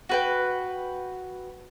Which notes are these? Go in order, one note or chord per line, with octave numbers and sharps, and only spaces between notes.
F#4 B4 G5